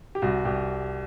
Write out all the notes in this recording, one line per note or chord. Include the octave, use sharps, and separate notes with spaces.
G4
C2 F#4
C2 G4